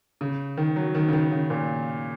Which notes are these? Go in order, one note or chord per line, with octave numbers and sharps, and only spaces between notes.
C#3
D#3
F#3
D#3
C#3
D#3
C#3
A#2